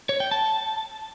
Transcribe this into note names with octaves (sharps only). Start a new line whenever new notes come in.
C#5
G5
A5